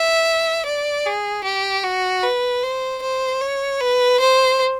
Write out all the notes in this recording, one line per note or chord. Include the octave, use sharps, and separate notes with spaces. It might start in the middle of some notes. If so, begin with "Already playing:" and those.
Already playing: E5
D5
G#4
G4
F#4
B4
C5
C5
C#5
B4
C5